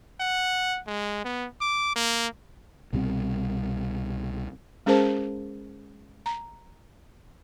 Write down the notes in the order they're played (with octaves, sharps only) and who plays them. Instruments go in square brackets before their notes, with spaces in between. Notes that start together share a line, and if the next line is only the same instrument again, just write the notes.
[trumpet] F#5
G#3
B3
D6
A#3
[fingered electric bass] C2 B2 G3 C4
[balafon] G#3 C#4 G#4 A#4 C5 A5
A#5